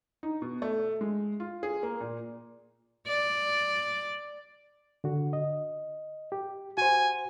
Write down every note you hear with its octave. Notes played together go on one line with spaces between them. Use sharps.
D#4
B2
A3
G#3
F4
G#4
A#3
A#2
D5
D3 F#4
D#5
G4
F#4 C5 G#5